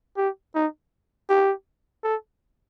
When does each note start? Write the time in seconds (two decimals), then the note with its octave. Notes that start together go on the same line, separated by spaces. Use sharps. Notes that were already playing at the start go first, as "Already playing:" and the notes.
0.17 G4
0.55 D#4
1.30 G4
2.04 A4